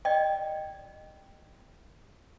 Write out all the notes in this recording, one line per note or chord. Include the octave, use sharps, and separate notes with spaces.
D5 D#5 G5